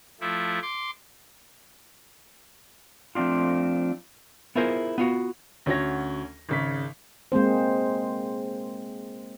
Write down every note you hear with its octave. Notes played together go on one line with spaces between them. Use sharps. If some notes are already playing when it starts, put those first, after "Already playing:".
F3 A3 E4
C6 D6
F3 A3 C4 D4 F4
B3 E4 F4 G#4 A#4 C5
B3 F4 F#4
D2 C#4 F#4 C#5 A#6
G#1 C#3 B6
G#3 A#3 C4 C5